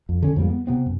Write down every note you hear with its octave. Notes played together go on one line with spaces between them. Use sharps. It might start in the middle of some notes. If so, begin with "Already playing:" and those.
F2
D3 C#4
F2 G#2 G3 A#3
B3
C3 B3 C4
F#2